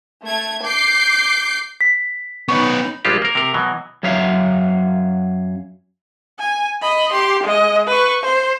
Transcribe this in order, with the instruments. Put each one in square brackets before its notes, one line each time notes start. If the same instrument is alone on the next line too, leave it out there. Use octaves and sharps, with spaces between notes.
[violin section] A3 G#6
D6 G6 C7
[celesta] B6
[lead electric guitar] B3 C#4 [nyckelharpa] D#4 B5 [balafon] C#6
[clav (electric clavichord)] A#1 G3 G#3 F4 G4
A#3 A#4
C3 A#4
B2 E3 F#3
[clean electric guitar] F#2 F#3 C#5 E5 F5
[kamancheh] G#5
D#5 B5
G4 C6
G#3 D#5
B4 C#6
C5